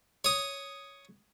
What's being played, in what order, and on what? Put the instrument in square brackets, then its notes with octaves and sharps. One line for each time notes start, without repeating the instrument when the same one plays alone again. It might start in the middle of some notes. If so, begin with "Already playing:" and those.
[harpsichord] C#5 D#6